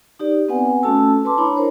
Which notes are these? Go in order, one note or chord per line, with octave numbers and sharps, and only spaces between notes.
D#4 G4 D5
B3 C4 B4 F#5 G#5
A3 C#4 F#4 A4 A5 E6
B4 A5 C6 D6
D4 E4 C#5 A#5 B5
A#4 C5 C#5